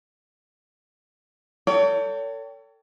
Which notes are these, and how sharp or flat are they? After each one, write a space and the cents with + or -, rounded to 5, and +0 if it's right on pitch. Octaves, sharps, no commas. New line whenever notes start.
A4 +35 C#5 +40 G5 +0